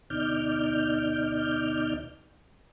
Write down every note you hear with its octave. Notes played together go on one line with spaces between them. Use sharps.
D2 B2 D#4 D5 F6 G6